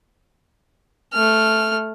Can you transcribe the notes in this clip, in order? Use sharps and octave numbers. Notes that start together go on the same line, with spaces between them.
A3 F6